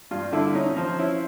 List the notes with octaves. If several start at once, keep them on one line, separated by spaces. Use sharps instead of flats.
G2 F4
D3 E4
C#4 D#4
F3
C#4 E4